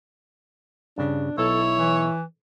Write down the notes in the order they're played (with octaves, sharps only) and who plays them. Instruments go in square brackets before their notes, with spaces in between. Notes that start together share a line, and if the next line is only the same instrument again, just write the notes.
[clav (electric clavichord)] G2 C#3 [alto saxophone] D4
[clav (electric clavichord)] B1 [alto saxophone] E4 [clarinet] A4 [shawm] C#5
[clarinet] E3